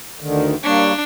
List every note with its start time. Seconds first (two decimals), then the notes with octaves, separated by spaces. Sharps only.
0.20 D2 D3 D#3
0.64 G3 A#3 D4 C#5